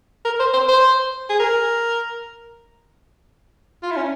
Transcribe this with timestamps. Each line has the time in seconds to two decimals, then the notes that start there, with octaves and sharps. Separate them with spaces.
0.25 A#4
0.40 C5
0.53 C5
0.68 C5
1.29 G#4
1.39 A#4
3.83 F4
3.91 E4
3.97 C#4